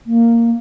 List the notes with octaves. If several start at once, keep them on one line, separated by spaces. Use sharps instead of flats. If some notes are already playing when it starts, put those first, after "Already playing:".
A#3